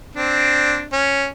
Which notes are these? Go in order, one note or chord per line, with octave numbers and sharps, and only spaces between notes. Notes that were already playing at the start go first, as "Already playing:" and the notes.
C4 D4
C#4